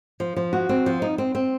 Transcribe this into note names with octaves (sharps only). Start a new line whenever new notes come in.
F3
F3
F#4
C4
F3
D#4
C4
C4